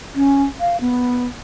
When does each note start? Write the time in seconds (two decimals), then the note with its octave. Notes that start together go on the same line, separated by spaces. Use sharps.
0.15 C#4
0.60 F5
0.81 B3